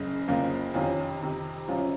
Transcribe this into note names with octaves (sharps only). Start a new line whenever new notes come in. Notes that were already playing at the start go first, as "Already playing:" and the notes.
Already playing: F#1 C#3
F#1 F2 C#3 F3 A#3
F2 C3 D#3 C#4 F4
F2 C3 D#3
F#1 F#2 F3 C#4 F4